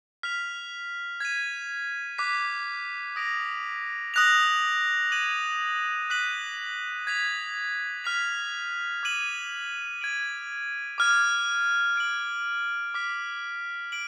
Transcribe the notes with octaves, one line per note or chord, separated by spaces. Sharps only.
F6 B6 F7
G#6 B6 D#7
D6 F#6 B6
D#6 A#6 D7 F7
D#6 F#6 A#6 F7
D6 G#6 D#7 F#7
F#6 B6 D#7 F#7
G#6 B6 F7
F6 B6 F7
D6 G#6 D#7 F#7
G#6 D7 F#7
D6 F6 G#6
G#6 D7 F#7
D6 F6 B6
D7 F#7